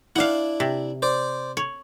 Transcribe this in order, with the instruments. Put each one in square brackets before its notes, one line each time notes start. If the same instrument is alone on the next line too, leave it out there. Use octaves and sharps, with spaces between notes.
[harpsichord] D4 E4 [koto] F5 F#5
[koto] C3
[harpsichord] C5 D5
[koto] C#5